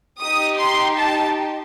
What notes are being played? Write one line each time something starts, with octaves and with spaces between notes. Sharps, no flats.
D#4 G4 D#6
C6
A5